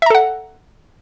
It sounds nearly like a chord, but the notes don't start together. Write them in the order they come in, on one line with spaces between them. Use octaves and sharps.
E5 A#5 A4 F#5